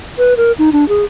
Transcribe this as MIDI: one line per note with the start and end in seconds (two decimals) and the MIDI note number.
0.18 0.34 71
0.37 0.52 70
0.59 0.69 63
0.73 0.88 62
0.89 1.05 68